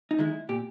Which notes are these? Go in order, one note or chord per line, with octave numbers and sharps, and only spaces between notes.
D#4
D#3 G#3 E4
A#2 G4